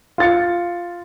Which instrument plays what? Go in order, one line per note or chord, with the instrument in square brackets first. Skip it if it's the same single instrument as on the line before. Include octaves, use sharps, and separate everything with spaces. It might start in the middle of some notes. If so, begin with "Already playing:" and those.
[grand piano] F4 A6 C#7